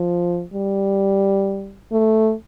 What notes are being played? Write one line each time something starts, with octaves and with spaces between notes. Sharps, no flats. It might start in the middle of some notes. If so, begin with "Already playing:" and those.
Already playing: F3
G3
A3